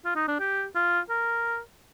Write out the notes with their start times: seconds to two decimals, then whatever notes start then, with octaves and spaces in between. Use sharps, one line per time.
0.05 F4
0.16 D#4
0.28 D4
0.40 G4
0.75 F4
1.10 A#4